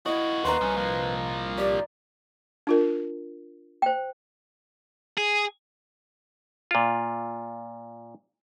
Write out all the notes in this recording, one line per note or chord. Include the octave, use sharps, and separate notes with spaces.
A#3 E4 F#4 D#5
D#2 B4 A#5 C6
C2 F3 C#4
F3 A#3
G4 D5
D4 F4 A#4
C5 G5
G#4
A#2 F4